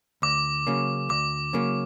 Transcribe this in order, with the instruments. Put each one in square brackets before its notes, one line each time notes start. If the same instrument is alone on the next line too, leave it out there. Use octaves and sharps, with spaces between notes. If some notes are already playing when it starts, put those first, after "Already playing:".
[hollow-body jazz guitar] D2 [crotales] D6
[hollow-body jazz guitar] C#3 F#3 A#3 C#4
[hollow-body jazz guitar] D2 [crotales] D6
[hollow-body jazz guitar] C#3 F#3 A#3 C#4